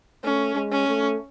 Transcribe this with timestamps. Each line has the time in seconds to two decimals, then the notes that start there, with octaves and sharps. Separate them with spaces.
0.24 A3 C#4
0.55 G#3
0.72 C#4
0.88 A3